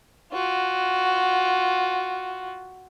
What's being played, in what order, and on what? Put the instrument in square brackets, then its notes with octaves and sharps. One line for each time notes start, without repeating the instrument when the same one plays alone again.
[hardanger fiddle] F4 F#4